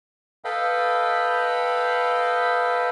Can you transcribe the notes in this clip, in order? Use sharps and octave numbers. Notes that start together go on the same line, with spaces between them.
A4 B4 D#5 F5 G5 B5